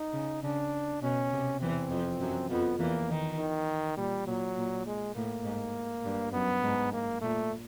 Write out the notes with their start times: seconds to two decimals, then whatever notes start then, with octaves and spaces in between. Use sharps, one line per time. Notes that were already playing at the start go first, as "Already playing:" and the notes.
Already playing: D#4
0.13 C#3
0.43 C#3 D4
1.02 B2 C#4
1.32 C3
1.61 E2 E3 C4
1.90 F2 F3
2.21 F#2 F#3
2.50 F2 F3 B3
2.79 E2 E3 A#3
3.09 D#3
3.39 D#3
3.97 A#2 G3
4.27 A#2 F#3
4.56 A#2
4.86 G#3
5.15 A2 A#3
5.44 G#2
6.04 G2
6.33 F#2 B3
6.63 G#2
6.93 A#3
7.21 A#2 A3